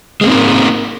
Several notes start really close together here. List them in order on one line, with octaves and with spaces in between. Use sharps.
G#3 A#3 C4 D#4 A#4